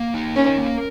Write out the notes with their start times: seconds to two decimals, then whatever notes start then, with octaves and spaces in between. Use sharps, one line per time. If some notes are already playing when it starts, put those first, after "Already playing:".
Already playing: A#3
0.14 D#4
0.36 C#4 A#4
0.58 A#3